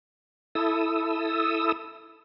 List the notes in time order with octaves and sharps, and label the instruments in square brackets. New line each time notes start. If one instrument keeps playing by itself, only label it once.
[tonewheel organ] E4 A4 D#6 E6